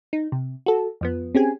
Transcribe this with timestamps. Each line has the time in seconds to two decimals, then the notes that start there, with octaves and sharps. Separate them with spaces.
0.13 D#4
0.32 C3
0.66 F#4 A4
1.01 F2 F3 B3
1.35 C4 C#4 G4 G#4 G#5